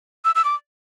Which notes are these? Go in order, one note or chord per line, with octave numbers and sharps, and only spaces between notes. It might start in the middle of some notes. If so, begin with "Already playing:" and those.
E6
E6
D6